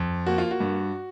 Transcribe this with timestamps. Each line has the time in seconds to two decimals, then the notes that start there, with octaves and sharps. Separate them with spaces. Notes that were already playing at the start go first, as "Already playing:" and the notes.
Already playing: F2
0.26 A#3 F#4
0.38 F4
0.51 F#4
0.60 G2